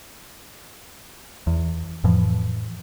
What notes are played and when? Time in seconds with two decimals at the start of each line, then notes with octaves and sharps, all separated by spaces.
1.47 E2
2.04 F2 A2 E3 F3